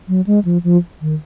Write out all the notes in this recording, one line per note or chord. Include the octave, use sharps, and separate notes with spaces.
F#3
G#3
F3
F3
D#3